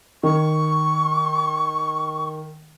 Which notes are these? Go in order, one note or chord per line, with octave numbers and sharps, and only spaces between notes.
D#3 C#6